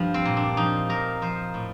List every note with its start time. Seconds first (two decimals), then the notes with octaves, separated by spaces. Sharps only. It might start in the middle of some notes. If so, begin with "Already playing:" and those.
Already playing: G2 F3
0.14 C4
0.25 A#2
0.37 D4
0.57 F3 D#4
0.89 A#2 A#4
1.22 F3 C5
1.54 A2